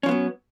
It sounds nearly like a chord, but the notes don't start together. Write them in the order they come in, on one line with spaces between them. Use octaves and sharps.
C#4 F3 B3 F#3